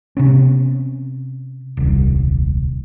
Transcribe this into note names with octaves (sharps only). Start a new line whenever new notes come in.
C3 B3 C#4
D#1 C2